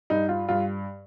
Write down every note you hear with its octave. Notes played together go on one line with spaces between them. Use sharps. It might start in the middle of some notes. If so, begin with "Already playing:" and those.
G2 D#4
F4
G2 F4